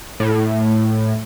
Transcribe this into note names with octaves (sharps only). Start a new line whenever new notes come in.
A2